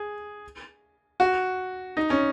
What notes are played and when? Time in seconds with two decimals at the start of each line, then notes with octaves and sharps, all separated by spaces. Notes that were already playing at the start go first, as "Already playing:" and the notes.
Already playing: G#4
1.20 F#4
1.97 D#4
2.10 C#4